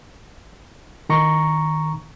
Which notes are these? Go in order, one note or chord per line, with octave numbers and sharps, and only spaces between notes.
D#3 A#5 C#6